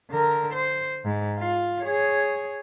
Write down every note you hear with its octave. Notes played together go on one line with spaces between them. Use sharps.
D3 A#4
C5
G#2
F4
G#4 C#5